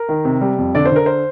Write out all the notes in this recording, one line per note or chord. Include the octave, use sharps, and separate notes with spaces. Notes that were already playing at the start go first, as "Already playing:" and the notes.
Already playing: A#4
D#3
C3
G3
F2
D3 D5
C5
D3 A#4
C5